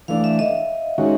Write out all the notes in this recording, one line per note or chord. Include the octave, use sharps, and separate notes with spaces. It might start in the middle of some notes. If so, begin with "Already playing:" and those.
E3 A3 D4 F5
E5
D#5
D#3 G#3 C#4 F#4